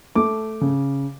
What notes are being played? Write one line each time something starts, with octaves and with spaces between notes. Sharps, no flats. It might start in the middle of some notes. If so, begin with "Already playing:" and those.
A3 D6
C#3